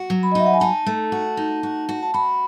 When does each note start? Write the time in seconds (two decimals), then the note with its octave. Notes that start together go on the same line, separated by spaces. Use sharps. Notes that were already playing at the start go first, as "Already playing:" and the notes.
Already playing: F#4
0.10 F#3
0.23 B5
0.32 D#5
0.35 D#4 E5
0.46 F#5
0.54 G#5
0.60 D#4 A5
0.86 A3
1.12 F#4
1.37 D#4
1.63 F#4
1.89 F#4
2.03 A5
2.14 F#4 B5